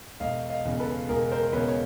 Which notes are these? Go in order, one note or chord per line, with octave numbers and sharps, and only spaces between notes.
E1 D#5 F5
D#5 F5
E2 C#3
A4 B4
E1 G#4 A#4
A#4 C5
E2 C#3 B4 C#5
C#5